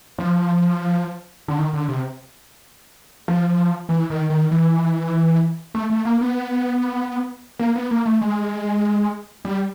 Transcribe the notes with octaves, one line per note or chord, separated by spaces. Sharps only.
F3
D3
D#3
D3
C3
F3
E3
D#3
D#3
E3
A3
A3
A#3
B3
A#3
B3
A#3
A3
G#3
G3